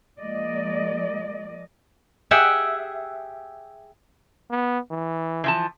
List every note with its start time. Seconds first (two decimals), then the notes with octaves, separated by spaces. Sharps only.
0.19 F3 G#3 A#3 D5 D#5
2.31 G4 G#4 E5 F#5 G5
4.50 B3
4.90 E3
5.44 E3 F3 A5